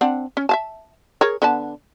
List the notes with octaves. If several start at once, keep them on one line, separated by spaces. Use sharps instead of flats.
C4 D4 F#5
C#4
E5 F5 A5
G#4 A#4 C#5
D3 B3 A5